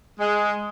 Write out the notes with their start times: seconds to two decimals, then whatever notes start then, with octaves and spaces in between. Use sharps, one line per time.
0.19 G#3